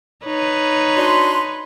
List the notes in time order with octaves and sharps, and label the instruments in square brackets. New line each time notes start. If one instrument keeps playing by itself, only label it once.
[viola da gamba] D#4 B4 C#5
[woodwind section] D4 F#4 C6